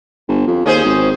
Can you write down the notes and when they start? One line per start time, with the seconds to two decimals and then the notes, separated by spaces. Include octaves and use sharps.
0.29 G1
0.47 F2
0.66 D#2 C#4 G#4 C5
0.84 G#1